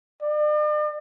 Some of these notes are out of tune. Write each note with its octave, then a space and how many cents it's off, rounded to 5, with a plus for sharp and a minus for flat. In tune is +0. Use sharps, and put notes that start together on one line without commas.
D5 +40